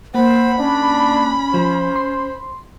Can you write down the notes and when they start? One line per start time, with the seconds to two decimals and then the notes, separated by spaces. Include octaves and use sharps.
0.15 A#3 C5 F#5 B5
0.58 C#4 D4
1.54 F3 C5
1.96 C6